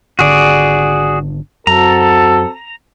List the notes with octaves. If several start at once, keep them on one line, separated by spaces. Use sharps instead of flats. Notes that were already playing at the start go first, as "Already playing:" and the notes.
G#1 D3 F#4 G#4 D5
F#2 C4 F#4 A4 A#5